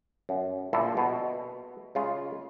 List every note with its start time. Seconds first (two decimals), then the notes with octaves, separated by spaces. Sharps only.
0.29 F#2
0.73 A#1 A#2 E4 A4 E5
0.97 B2
1.95 C#3 G#3 F4